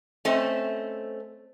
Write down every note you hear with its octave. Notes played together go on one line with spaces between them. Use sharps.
A3 C4 C#4 C5 D#5